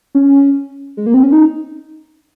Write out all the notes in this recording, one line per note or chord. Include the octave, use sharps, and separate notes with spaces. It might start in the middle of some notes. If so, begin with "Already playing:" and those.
C#4
G#3
A#3
C4
C#4
D#4